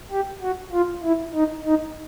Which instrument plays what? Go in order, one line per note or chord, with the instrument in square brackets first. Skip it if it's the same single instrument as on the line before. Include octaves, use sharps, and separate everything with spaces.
[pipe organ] G4
F#4
F4
E4
D#4
D#4